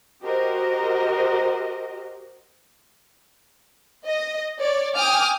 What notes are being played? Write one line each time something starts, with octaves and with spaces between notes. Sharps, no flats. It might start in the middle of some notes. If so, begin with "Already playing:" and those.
F#4 G4 A#4 C5 D#5
D#5
C#5 D5
G5 G#5 D6 D#6 F6